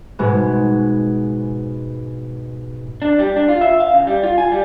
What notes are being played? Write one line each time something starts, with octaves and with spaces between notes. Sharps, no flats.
G#2 B2 G#3 B3
D4
G3
D4
F4
E5
F5
C#3
G3
F4
G#5
G3